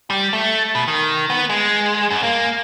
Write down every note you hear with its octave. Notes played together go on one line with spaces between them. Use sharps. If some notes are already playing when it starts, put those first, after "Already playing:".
G3
A3
B2
D#3
B3
G#3
F#2
A#3